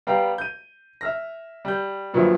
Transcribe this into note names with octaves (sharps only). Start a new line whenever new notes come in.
G3 B3 F5 G5 A#5
G6 D#7
E5 F6 A#6
G3 G6
G2 A#2 F3 F#3 B3 E5